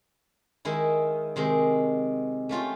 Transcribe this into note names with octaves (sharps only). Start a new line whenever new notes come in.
D#3 G#3 E4
C3 D#3 G#3
A3 C#4 F4 G4